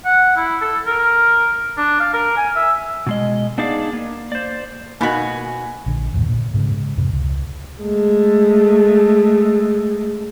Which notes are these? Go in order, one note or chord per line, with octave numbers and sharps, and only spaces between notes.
F#5
E4
A4
A#4
D4
F5
A#4
G#5
E5
B2 G#3 D#5
B3 D4 D#4 G#4 D5 F5
A#3
C5 D5
B2 A#3 D#4 F#4 G#5 B5
A#1 D3
G1 D#2 A2
A#2
G#2 C#3 G#3
F2 G#2 C3
C#2
G#3 A3